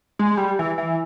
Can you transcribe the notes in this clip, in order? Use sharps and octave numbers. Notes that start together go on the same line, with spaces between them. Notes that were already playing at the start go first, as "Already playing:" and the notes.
G#3
G3
E3
E3